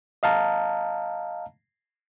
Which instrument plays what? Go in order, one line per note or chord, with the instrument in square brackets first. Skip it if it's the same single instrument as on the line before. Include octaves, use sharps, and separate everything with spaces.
[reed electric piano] D#5 F5 A5 A#5